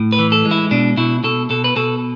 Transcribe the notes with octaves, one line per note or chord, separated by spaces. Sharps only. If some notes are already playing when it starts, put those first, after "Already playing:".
Already playing: A2
B4
E3
A4
G#3
E4
B2 D4
B2 E4
B2 A4
B2 A4
B4
B2 A4